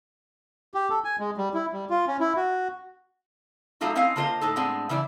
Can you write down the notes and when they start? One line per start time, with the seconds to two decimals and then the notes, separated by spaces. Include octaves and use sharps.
0.74 G4
0.90 A4
1.04 G#5
1.19 G#3
1.37 G3
1.54 E4
1.73 G3
1.90 F4
2.08 C#4
2.20 E4
2.36 F#4
3.81 F#3 G3 A3 D#4 F4 F#4
3.95 C4 C#4 E4 D#5 F5
4.16 D3 A#3 F4 A#4 C5 D#5
4.41 A2 D#4 A4
4.56 A2 G#3 B3 C4 D4
4.89 C#3 E3 E4 B4 D5